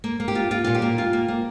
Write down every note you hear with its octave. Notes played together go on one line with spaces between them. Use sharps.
A#3
A#3
G4
F4
A#3 F4
A#2 F4
G4
A#3
F4
A#3
A#3